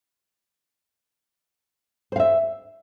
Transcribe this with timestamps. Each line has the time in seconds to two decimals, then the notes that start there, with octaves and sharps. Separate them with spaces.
2.12 C5
2.16 F5
2.20 E5